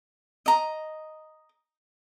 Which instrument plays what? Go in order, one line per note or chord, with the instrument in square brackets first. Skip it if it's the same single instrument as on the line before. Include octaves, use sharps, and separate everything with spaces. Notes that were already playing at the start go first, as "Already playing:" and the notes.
[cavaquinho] D#5 A#5